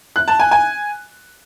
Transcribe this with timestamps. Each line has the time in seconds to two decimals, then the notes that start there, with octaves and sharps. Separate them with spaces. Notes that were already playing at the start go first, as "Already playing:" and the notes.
0.16 F#6
0.28 A5
0.40 G#5
0.51 G#5